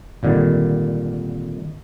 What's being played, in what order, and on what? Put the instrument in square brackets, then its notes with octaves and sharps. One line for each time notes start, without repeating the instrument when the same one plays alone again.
[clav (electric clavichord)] G#1 A#2 D3 D#3 G3